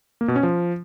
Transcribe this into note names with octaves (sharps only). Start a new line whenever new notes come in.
A#3
B2
C#4
F3